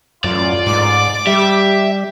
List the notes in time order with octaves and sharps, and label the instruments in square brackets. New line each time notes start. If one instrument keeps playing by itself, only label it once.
[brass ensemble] A1 F4 [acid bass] F#2 [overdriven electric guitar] D5
[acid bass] G#2 [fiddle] D6
[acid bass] G3 [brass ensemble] G4 [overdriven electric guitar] E5